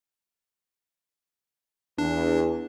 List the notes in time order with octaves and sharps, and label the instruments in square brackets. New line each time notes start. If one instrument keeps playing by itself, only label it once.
[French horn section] E2 [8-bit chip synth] D4